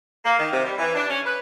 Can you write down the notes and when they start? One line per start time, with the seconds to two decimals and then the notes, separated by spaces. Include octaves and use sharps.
0.24 A#3
0.38 D#3
0.52 C3
0.65 G3
0.78 E3
0.95 D4
1.09 C#4
1.26 B4